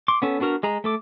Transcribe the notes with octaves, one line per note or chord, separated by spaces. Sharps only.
C6 D6
B3 C#4 A4
B3 D4 F#4 A#4 F6
G#3 G#4 A#5
A3 A4 D6